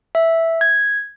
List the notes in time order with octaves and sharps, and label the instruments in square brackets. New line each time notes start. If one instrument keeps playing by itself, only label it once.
[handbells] E5
G#6